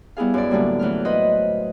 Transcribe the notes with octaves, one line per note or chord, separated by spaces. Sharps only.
G3 B3 E4 G#4 F5
F#2 D5
A2 D3 F#3 G3 A#3
E3 F#3 A3 F6
B4 C5 D#5 F#5